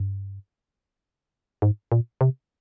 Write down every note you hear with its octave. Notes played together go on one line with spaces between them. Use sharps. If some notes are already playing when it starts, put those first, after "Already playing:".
Already playing: G2
G#2
A#2
C3